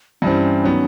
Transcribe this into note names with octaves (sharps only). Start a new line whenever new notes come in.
G2 E3 G3 C4 C#4
D#3 F#3 B3